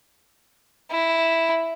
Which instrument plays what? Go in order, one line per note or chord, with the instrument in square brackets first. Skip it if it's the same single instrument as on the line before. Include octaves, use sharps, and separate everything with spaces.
[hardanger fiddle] E4